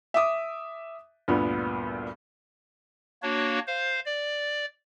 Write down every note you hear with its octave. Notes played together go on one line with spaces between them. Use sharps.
E5 D6 D#6
D2 G2 A#2 B3
A#3 D4 F#4 C#5
C5 F5
D5